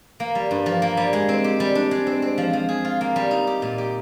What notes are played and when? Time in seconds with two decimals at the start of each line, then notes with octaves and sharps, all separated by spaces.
0.20 A#3
0.35 G3
0.51 G2
0.66 F3
0.82 A#3
0.97 G3
1.13 G#3
1.29 C4
1.44 G4
1.60 G3
1.75 D4
1.91 G#3
2.07 C4
2.22 C4
2.38 F3
2.53 F3
2.69 G#4
2.85 F4
3.01 A#3
3.16 G3
3.31 D#4
3.47 G4
3.62 A#2
3.78 G4